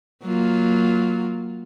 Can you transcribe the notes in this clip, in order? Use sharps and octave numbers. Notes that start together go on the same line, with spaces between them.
F#3 A#3 F4